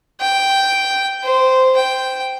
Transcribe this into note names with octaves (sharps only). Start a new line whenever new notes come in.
G5
C5
G5